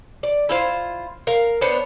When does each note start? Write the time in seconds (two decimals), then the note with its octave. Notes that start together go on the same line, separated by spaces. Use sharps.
0.23 D5
0.49 E4 F4 C5
1.27 A#4 F5
1.61 B3 D4 C5 C#5